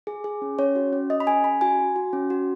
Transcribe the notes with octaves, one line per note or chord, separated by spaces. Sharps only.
G#4
G#4
C#4
C#4 C#5
F#4
C#4
C#4 D#5
B5
G#4 G#5
C#4 B5
F#4 G#5
F#4
F#4
C#4
F#4